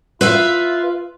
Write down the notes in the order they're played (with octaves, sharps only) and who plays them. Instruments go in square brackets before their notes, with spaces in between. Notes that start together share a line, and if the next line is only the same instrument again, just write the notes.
[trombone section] F4 [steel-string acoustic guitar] B4 E5 F5